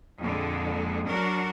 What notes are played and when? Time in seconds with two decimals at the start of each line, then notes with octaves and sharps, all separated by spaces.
0.20 F2 A#2 D3 G#3
1.06 F#3 D4 F#4 A#4